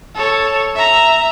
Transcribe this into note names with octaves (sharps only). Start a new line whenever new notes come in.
A4 C#5
E5 A#5